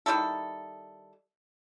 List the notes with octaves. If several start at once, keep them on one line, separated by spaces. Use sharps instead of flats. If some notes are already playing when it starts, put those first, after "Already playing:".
D#3 G3 E4 A4